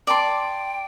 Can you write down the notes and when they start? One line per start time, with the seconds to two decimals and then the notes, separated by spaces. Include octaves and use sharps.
0.07 D5 G5 A5 C6